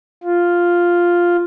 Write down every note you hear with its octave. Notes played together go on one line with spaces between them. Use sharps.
F4